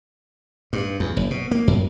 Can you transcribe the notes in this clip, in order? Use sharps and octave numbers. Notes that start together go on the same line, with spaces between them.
G2
E2
F#1
B2
A#3
F#2